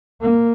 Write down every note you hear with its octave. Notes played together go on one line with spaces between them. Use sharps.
A#3